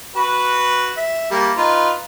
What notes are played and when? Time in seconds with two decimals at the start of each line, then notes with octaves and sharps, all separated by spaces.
0.16 F#4 B4
0.97 E5
1.31 G3 A#3
1.57 D#4 F4 B4